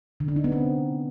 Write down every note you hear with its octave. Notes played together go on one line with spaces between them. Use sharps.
D3
D4
D#4
B3
C4